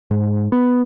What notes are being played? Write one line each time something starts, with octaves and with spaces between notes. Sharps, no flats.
G#2
B3